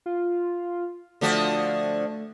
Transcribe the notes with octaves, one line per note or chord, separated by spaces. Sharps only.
F4
D3 F3 A3 F#4